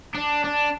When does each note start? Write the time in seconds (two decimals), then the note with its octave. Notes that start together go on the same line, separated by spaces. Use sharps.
0.15 D4
0.44 D4